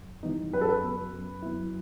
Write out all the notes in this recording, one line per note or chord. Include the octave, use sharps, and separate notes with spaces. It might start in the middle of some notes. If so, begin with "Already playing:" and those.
Already playing: F#2
E3 G3 B3 D#4
F#2 B4
A4
B4
F#3 B3
F#2
F#3 B3 E4